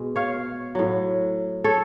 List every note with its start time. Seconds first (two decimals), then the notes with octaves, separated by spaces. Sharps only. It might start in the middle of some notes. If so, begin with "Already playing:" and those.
Already playing: B2 G#3
0.16 C#5 F5
0.75 A2 F#3
1.64 A4 C#5